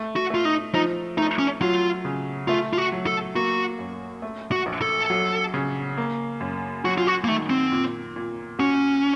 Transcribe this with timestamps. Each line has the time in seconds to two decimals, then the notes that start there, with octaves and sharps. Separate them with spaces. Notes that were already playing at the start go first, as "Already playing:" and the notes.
Already playing: A3
0.16 F#4
0.30 A3 F4
0.45 D#4
0.74 F3 D#4
1.17 A3 D#4
1.39 C#4
1.61 F#3 F4
2.05 C#3
2.48 A3 F4
2.73 F4
2.78 F#4
2.92 F#3
3.07 A4
3.36 A#3 F#4
3.79 F#2
4.22 A3
4.52 F#4
4.66 A#1
4.82 A4
5.10 F#3
5.54 C#3
5.97 A#3
6.41 F#2
6.85 F#3 F#4
6.98 F4
7.07 F#4
7.24 A#3
7.28 D#3 A3
7.50 C4
7.72 A#2
8.16 A#2
8.59 C#4 F#4